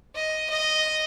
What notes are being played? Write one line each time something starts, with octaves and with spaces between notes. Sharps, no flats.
D#5
D#5